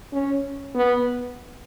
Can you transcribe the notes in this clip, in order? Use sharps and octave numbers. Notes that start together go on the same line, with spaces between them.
C#4
B3